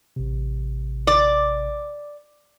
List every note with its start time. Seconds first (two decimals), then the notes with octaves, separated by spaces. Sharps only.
0.16 A1 C3
1.07 D5